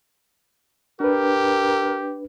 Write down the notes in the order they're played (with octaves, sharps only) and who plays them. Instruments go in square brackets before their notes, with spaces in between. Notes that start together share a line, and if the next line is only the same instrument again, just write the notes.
[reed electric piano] D4 B4 [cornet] G4 [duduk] A#4